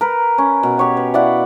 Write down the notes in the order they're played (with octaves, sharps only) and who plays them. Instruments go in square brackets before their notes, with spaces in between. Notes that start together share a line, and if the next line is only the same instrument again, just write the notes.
[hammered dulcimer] A#4 B4
C#4
B2
G4 C#5 F#5
B4
E4 D5 F5 F#5